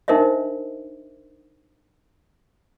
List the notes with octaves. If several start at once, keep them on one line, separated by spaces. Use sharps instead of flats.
D4 D#4 A#4 C5 D#5 E5